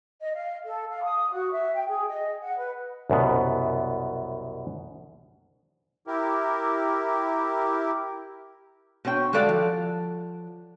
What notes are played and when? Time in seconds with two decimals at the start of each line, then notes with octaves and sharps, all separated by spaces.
0.21 D#5
0.34 F5
0.66 A4
0.90 F5
1.02 D#6
1.31 F#4
1.51 E5
1.74 G5
1.87 G#4
2.09 D#5
2.42 F#5
2.57 B4
3.10 C2 F#2 B2 B3
6.07 E4 G4 A#4
9.05 B2 C4 C#5 G5
9.33 G3 G#3 F#4 A4 D5 F5
9.49 F3